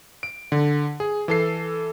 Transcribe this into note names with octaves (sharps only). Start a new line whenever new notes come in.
D7
D3
G#4
E3 A4 C7